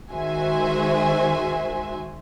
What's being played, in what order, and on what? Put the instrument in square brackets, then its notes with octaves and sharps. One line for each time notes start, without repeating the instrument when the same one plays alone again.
[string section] D#3 G#3 F#4 C5 E5 G#5